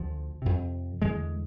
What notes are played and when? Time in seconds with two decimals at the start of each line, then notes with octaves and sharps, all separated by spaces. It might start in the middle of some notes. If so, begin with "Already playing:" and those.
Already playing: D2 D3 F3
0.42 F2 C3
1.02 E2 D3 G#3